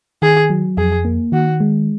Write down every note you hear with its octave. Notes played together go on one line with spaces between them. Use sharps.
D#3 G#4
F#3
F2 G#4
A#3
D#3 F#4
G#3